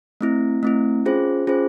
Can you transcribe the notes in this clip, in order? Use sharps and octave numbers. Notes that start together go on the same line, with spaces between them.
A3 C4 E4
A3 C4 E4
C#4 F4 G#4 C5
C#4 F4 G#4 C5